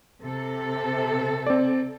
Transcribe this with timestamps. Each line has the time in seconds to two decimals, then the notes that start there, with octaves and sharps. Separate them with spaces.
0.22 C3 A4
1.47 C4 D5